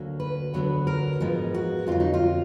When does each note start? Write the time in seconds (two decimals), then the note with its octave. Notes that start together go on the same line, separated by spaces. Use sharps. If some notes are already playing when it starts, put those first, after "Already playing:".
Already playing: D2 D3 F#3 A#3
0.20 B4
0.54 D2 D3 F#3 B3
0.87 A#4
1.20 G#2 F3 G#3 B3
1.54 F#4
1.87 F2 D3 F#3 F4
2.00 D#4
2.14 F4